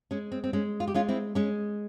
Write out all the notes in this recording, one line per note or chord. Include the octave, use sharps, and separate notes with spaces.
G#3 C#4
C4
C4
G#3 C#4
F4
G4
G#3 C#4 F4
C4 E4
G#3 C#4